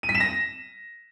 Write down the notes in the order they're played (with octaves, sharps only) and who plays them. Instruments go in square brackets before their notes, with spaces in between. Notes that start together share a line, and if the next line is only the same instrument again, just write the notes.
[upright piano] D#7
B6
E7
A#6